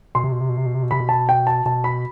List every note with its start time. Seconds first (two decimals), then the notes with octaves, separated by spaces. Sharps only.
0.15 B2 C6
0.24 C3
0.32 B2
0.41 C3
0.49 B2
0.57 C3
0.66 B2
0.75 C3
0.83 B2
0.91 C3 B5
1.00 B2
1.09 A5
1.29 G5
1.47 A5
1.65 B2 A5
1.84 B5